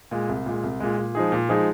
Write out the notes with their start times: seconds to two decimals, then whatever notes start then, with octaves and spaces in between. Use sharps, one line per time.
0.11 A#2 G#3
0.29 C2
0.46 A#2 G#3
0.64 C2
0.80 A#2 G#3
0.98 A#2
1.15 F3 G#3 D#4 G#4
1.32 A#2
1.49 F3 G#3 D#4 G#4